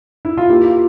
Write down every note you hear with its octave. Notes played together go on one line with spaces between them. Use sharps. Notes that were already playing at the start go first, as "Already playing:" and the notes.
E4
F4
A#3 E4 G4
F4